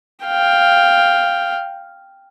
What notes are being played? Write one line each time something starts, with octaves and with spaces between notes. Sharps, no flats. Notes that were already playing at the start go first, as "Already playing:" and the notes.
F5 G5